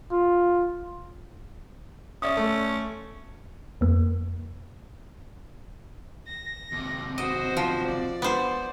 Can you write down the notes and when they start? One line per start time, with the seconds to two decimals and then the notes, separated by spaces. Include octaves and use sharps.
0.12 F4
2.22 C#4 D5 E5 D#6
2.37 A3
3.81 F2 A#3
6.27 A#6
6.72 D#2 C3
7.18 F#4 C5 D#5
7.57 F3
7.87 D5
8.22 B3 C5